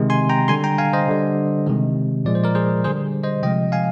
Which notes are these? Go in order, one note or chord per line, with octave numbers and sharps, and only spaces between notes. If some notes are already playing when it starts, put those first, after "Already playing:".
Already playing: C3 D#3 G#3
G#5 C6
G5 A#5
D3 G3 G#5 C6
G5 A#5
F5 G#5
C5 D#5
D3 G3
C3 D#3 G#3
A#2 F3 G#3 D5
C5
A#4 D5
G#4 C5
D3 G3 G#4 C5
C5 D#5
C3 F3 G#3 D#5 G5
F5 G#5